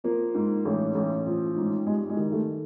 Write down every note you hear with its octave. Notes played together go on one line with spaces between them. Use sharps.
F3 A#3
G#2
A1
A1
F3
G#2
G3 G#3
G#3
D#3
A3